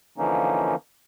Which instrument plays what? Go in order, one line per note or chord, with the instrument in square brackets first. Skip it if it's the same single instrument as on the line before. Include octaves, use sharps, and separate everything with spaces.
[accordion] D3 E3 F3 A#3 C#4 D#4